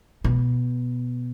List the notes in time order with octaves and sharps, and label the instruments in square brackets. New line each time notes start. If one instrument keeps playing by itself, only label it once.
[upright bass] B2